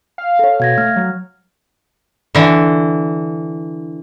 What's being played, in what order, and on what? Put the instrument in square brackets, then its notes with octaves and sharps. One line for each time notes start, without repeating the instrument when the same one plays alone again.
[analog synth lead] F5
[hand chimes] A4 C#5
[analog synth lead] B2 [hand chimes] F5 G#6 A#6
[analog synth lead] A3 [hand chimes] F6
[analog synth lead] F#3
[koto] D3 E3